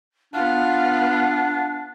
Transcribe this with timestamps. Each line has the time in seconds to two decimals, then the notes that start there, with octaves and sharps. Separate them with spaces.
0.34 B3 D4 F4 F#5